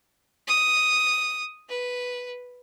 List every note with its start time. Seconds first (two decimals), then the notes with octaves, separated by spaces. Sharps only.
0.48 D#6
1.69 B4